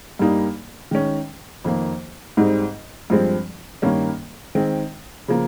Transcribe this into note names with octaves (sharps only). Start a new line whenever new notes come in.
G2 G3 A#3 D#4
D#3 G#3 C#4
F2 D#3 A#3
G#2 G3 C4 D#4
G2 F3 G#3 C4
G2 D#3 A#3 C#4
D#3 G#3 C4
C#3 F3 A#3